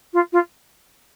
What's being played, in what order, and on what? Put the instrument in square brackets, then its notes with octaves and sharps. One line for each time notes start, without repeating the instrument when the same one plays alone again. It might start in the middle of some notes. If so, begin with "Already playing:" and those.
[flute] F4
F4